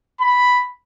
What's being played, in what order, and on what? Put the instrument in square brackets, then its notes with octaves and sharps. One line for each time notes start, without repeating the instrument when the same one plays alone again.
[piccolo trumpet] B5